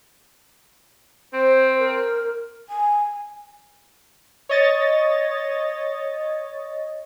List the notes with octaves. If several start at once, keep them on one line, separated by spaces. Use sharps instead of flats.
C4 C5
A#4
G#5
C#5 D#5 A6